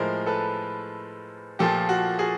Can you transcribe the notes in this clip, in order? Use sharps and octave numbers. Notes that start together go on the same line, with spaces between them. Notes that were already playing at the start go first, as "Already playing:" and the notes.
Already playing: A2 F3 G#3 A#4 C5
A4 B4
A#2 F3 A3 G4 A4
F#4
F#4 G#4